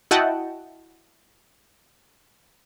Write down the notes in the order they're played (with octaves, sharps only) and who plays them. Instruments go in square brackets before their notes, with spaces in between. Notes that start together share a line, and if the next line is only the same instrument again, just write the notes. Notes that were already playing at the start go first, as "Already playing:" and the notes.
[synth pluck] E4 F#4 D#5 F#5 G5 A5